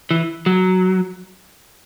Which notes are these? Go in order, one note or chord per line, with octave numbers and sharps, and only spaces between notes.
E3
F#3